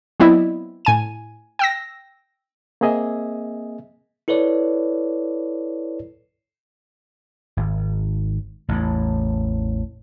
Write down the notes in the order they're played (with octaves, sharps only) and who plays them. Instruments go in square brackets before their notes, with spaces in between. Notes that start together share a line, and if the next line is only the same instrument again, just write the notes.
[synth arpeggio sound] F#3 B3 C4 E4 D5 D#5
A2 G#5 D#7
G5 E6 A#6
[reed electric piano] A#3 C4 G#4 D#5 E5 G#5
[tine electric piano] E4 A4 B4 C#5 D5
[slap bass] G#1
A1 E2 A2